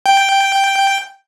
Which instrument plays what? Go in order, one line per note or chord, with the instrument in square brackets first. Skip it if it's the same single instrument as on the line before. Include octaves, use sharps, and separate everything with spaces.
[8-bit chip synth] G5